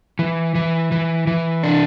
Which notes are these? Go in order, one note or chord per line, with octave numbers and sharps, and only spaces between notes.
E3
E3
E3
E3
D4